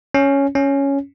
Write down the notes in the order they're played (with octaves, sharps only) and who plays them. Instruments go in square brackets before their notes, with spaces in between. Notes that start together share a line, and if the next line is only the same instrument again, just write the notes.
[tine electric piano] C#4
C#4